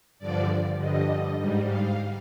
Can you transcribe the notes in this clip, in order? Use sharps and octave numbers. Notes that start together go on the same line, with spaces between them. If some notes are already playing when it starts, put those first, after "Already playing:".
G2 D3 F3 D5
G2 D3 G3 D#5
G#2 G3
F5